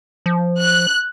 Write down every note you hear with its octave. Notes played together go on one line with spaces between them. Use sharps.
F3
F#6